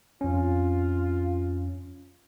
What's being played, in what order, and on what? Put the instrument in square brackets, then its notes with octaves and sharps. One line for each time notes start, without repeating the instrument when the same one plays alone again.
[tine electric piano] F2 C#4 [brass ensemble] F4